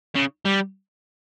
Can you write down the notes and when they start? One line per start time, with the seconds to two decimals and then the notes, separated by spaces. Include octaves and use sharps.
0.16 C#3
0.46 G3